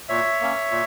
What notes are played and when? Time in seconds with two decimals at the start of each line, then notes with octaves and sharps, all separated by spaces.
0.09 A#2 C#5 E5
0.41 A#3 C#4
0.71 A#2